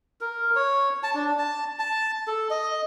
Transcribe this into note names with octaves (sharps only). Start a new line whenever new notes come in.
A#4
C#5
A5
D4
A5
A5
A4
D#5